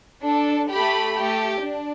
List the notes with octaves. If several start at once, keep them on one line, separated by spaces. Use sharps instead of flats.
D4 A4
A3 G4 B5
A3 G4
D4